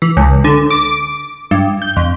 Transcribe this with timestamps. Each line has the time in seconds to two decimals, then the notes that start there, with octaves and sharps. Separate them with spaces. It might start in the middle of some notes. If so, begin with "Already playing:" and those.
0.02 E3
0.17 C#2
0.44 D3
0.70 D6
1.51 G2
1.82 G6
1.97 F2